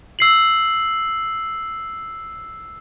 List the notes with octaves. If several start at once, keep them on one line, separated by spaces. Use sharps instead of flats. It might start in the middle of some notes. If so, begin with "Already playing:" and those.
E6 C7 F#7